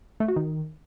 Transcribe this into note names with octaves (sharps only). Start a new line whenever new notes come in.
A3
F#4
D#3